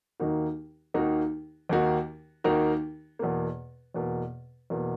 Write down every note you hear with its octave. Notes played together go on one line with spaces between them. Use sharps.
D#2 D#3 A#3 D#4 F#4
D#2 D#3 A#3 D#4 F#4
D#2 D#3 A#3 D#4 F#4
D#2 D#3 A#3 D#4 F#4
E2 B2 A#3
E2 B2 A#3
E2 B2 A#3